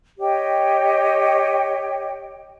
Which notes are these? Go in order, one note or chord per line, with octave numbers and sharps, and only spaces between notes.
G4 C#5 D#5 G5